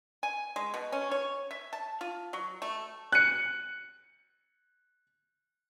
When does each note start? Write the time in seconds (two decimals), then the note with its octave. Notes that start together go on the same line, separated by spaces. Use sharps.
0.23 G#5
0.56 G#3
0.74 B2
0.92 C#4
1.11 C#5
1.51 E5
1.73 A5
2.01 F4
2.33 F#3
2.62 A3
3.12 F#6 C#7